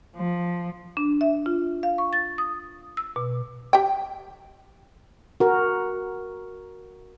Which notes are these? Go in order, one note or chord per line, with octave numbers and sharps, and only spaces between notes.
F3
D4
E5
F4
F5
C#6
A6
D#6
E6
B2
G4 G5
F#4 A#4